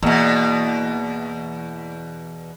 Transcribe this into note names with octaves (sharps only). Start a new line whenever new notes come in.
E2 B2 A#3